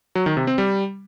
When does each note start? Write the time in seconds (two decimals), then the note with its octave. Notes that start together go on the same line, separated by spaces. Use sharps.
0.15 F#3
0.26 D#3
0.37 C3
0.47 C4
0.58 G3